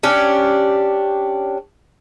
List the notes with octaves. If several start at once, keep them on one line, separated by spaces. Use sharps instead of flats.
C#4 D4 G4